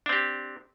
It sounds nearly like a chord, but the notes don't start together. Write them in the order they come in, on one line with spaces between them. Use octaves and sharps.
D4 C4 G4